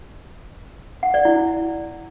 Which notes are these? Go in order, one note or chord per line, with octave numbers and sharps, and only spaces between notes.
F#5
D5
E4